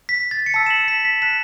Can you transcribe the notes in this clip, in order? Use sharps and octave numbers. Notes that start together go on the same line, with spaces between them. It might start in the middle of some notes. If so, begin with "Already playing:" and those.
B6
A6
C#7
A5 E6 B6
E7
C#7 F#7
B6 E7
B6
A5 F#6 B6 E7